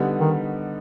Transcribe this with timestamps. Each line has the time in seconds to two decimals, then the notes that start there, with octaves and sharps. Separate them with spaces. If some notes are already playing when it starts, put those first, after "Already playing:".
Already playing: D3 G3 B3 D#4
0.20 D#3